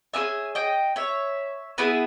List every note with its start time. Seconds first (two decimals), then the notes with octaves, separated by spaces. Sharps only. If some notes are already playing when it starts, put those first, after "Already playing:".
0.14 C#4 E4 G#4 E5 G#5
0.55 D#5 G5
0.96 C#5 E5
1.78 B3 E4 G#4 B4